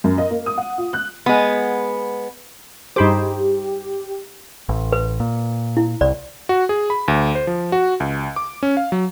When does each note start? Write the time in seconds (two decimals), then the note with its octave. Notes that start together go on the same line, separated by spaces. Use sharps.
0.04 F#2
0.18 D#5
0.31 A#3
0.46 D#6
0.58 F#5
0.78 F4
0.93 F#6
1.26 G#3 B3
2.96 G2 D#4 G4 G#4 C5 B5 D6
4.69 A1
4.92 B4
5.20 A#2
5.77 E4
6.01 C2 D5
6.49 F#4
6.69 G#4
6.90 B5
7.08 D2
7.35 C5
7.47 F3
7.72 F#4
8.00 C#2
8.36 D6
8.63 C#4
8.77 F5
8.92 F#3